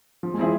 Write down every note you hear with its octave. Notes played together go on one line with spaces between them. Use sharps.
F3
G#3
F3 C4 E4 G#4 E5